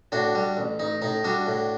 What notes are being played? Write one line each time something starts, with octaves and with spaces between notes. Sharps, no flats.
A2 D4 F#4
G3
A1
A1 D#4
A2 D#4
G3 D4 F#4
A2